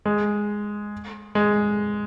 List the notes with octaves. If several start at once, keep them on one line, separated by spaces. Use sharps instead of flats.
G#3
G#3